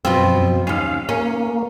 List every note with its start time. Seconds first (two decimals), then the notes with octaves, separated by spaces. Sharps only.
0.05 F#2 B2 F3 C4
0.67 D#2 C#4 F5
1.09 A#3 C#4